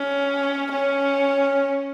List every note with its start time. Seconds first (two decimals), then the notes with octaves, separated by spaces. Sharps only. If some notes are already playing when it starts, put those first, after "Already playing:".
Already playing: C#4
0.72 C#4